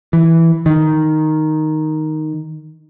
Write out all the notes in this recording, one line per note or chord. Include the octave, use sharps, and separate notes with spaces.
E3
D#3